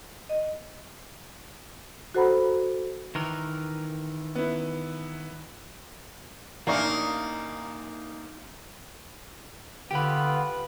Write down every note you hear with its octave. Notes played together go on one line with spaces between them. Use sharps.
D#5
F#4 A4 C5 F#5 A#5 B5
D#3 E3 A#4
B3 E4
A1 A#3 D4 D#4 C#6
D3 B3 F4 G4 B4